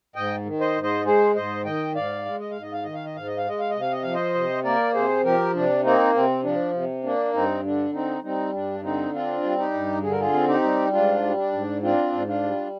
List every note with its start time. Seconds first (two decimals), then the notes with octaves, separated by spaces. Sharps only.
0.16 G#2 D#5 G5
0.45 D#3
0.60 C5 D#5
0.76 G#2
0.83 C5 D#5
1.05 G#3 G#4 C5
1.35 G#2 C5 D#5
1.65 D#3 D#5 G5
1.95 G#2 D5 F5
2.25 G#3
2.40 D#5
2.51 G#2 F5
2.62 D#5
2.73 F5
2.84 D#3 D#5
2.94 F5
3.05 D#5
3.15 G#2 F5
3.27 D#5
3.38 F5
3.45 G#3 D#5
3.60 F5
3.70 C3 D#5
3.81 F5
3.92 D#5
4.03 F3 F5
4.14 C5 D#5
4.35 C3
4.64 A#3 A#4 D5
4.94 C3 G#4 C5
5.24 F3 G4 A#4
5.54 C3 D4
5.84 A#3 C4 D#4
6.14 C3 C4
6.44 F3 D4
6.73 C3
7.04 A#3 D4
7.34 G2 C4 D#4
7.64 D3 D4
7.94 C4 D#4
8.23 G3 C4 D#4
8.53 G2 D4
8.83 D3 C4 D#4
9.13 C4 D4 F4
9.43 G3
9.58 D#4 G4
9.73 G2
10.03 D3 G#4
10.12 A#4
10.20 F4 G#4
10.33 C4
10.48 D#4 G4
10.63 G3
10.93 G#2 D4 F4
11.23 G3
11.37 D4
11.53 G#2
11.83 C4 D4 F4
12.12 G#2
12.27 D4 F4
12.43 G3